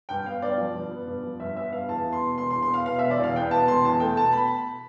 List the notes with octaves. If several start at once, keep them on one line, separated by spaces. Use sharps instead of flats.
G2 G5
B3 F5
G2 D5
F3
G2
B3
G2
F3
G2 E5
B3 E5
G2 F5
E2 A5
B3
C6
B2
E1 C6
C6
E2
C6
B3 F5
B2 F5
E1 E5
D5
E2 F5
B3 G5
B2 A5
E1 C6
E2 A5
A3 G5
B2 A5
B5